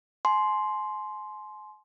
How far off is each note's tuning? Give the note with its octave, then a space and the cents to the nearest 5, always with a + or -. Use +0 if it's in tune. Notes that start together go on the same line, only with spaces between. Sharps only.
G#5 +40 C6 +0